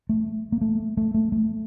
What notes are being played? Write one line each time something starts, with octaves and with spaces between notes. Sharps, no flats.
A3
A#3
A3
A3
A3
A3